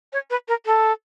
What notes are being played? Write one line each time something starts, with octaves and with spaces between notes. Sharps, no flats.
C#5
B4
A#4
A4